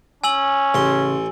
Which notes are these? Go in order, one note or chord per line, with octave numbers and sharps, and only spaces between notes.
C#4 G#5 E6 F#7
A1 C#3 C6